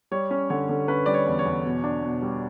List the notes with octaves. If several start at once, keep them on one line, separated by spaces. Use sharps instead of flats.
G3 C#5
C#4
D3 C#5
D3
C#4 B4
G3 D5
C#5
E2
C#5
E2
B2
D4
B2
G3